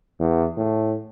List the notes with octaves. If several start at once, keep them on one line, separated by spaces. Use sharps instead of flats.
E2
A2